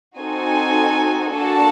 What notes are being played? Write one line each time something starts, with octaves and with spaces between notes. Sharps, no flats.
C4 D#4 F#4 A4 G#5
A#3 D4 F#4 A4 A5